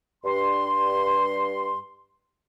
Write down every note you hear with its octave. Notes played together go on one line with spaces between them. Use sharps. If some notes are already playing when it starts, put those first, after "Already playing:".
G2 C6